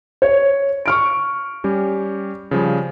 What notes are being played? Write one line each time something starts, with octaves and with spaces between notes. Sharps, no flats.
C#5
C#6 F6 D7
G3 C#4 G4
C#3 F3 G3